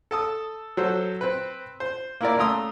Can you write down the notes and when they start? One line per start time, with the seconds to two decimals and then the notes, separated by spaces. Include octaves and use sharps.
0.11 A4 A5 D#6
0.77 F#3 A4 C5
1.21 C4 B4
1.80 C5
2.21 A#3 E4 A#4 D5
2.38 C#3 A3 A#5 C6 D#6 E6